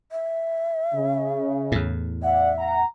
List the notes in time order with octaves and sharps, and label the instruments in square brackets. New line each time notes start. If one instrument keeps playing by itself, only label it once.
[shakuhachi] E5
[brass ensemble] C#3
[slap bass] E2 A2
[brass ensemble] D5 F#5 [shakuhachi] E5
[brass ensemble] F#5 A#5